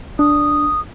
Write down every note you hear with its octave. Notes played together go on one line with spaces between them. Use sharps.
D4 D#6